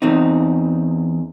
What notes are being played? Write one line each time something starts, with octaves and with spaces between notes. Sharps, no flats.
E2 C4 D#4